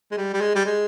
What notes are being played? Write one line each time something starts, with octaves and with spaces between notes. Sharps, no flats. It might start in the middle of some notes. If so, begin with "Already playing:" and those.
G#3
G3
G3
G#3
G3
G#3